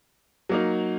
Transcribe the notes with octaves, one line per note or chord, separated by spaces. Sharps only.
F#3 A#3 D#4